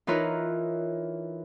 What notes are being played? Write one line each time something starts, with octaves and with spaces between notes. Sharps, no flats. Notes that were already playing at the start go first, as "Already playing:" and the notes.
E3 D#4 F4 A#4 B4 C#5